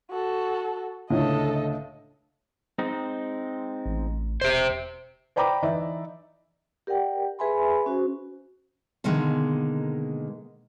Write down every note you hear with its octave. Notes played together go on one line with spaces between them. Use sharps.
F#4 A4
C#2 A2 D3 A4 D#5
G#3 C4 D#4
A1
E1 G4 C5
C5 D5 G5 A#5 B5 D6
E3 D#4 D5 E5
G4 A#4 D5 F#5 G5
G#4 B4 E5 G#5 B5 C6
C#4 F#4 C5
B2 D3 D#3 G#3 A#3